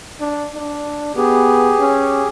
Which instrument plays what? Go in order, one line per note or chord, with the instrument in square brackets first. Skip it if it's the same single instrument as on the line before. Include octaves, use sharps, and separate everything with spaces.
[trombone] D4
D4
[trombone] B3 [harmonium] G4 G#4
[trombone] C#4